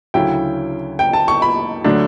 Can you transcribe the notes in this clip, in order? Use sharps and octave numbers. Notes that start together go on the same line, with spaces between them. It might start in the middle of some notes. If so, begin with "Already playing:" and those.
D2 C#3 F#3 C#4 E4 G5
G5
A5
C#6
B5
D3 F#3 A3 D4